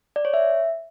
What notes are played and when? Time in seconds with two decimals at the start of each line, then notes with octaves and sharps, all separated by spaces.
0.16 D5
0.25 C#5
0.34 E5